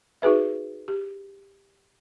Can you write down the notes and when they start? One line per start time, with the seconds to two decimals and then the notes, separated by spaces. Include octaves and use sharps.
0.22 D#4 F#4 G#4 B4 E5
0.88 G4